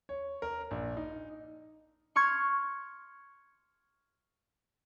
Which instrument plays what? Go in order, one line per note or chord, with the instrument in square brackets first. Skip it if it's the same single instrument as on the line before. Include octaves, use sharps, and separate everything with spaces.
[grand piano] C#5
A#4
A#1
D#4
[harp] C6 C#6 F6 G#6